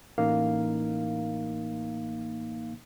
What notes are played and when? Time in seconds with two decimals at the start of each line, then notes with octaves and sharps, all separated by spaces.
0.18 A1 A#3 D#4 F5